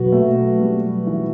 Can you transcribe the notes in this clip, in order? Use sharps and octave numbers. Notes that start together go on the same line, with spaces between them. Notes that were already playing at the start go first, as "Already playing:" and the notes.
Already playing: B2 F#3 F#4 B4
A3
G3
E3